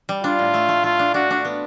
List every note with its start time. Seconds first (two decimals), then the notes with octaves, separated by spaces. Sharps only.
0.09 G3
0.24 D4 F4
0.39 A2
0.54 A3
0.69 A3
0.84 A3 F4
0.99 D4
1.14 D4 F#4
1.30 D4
1.45 B3